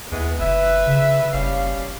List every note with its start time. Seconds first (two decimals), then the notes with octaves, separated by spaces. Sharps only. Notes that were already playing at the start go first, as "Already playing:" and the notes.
0.12 D#2 E3 G#3 B3
0.40 F#1 B4 E5
0.87 C#3
1.33 F#1 G3 C#4 F5